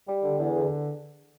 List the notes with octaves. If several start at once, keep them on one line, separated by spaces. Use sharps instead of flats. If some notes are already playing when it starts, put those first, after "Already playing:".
G3
D3
E2
D3